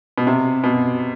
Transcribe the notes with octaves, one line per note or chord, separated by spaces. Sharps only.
B2
C3
B2